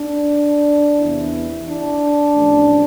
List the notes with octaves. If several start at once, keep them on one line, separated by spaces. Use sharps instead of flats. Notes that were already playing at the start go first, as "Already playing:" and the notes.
Already playing: D4
E2 C3 E3 E4
D4
A1 A2 F3